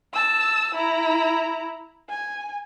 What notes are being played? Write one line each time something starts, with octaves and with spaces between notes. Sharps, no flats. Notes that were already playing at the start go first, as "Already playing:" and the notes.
A5 E6
E4 A#5
G#5